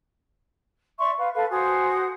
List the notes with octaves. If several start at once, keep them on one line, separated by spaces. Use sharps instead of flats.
D5 E5 C6 C#6
B4 F5
A4 B4 F5
F#4 C5 G#5 D#6